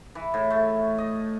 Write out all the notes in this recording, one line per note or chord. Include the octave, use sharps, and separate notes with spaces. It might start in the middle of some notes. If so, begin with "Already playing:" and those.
E3
A2
A3
D#5